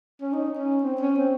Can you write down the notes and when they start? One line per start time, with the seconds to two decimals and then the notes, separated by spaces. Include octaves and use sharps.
0.21 C#4
0.33 D#4
0.58 C#4
0.83 C4
1.01 C#4
1.17 C4